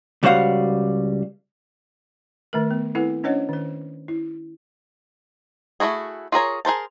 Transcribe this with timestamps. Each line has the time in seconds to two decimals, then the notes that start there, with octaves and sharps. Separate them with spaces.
0.23 C#2 G3 F#4 C5 F5 F#5
2.53 D#3 A3 A#4
2.71 B3
2.95 C4 E4 A4 B4 F#5
3.24 C#4 D4 C5 C#5 D#5 F#5
3.49 D#3 C5
4.08 E4
5.80 A3 B3 E4 F#4 G#4
6.32 F4 G#4 A#4 C#5
6.65 G#4 A#4 C5 A5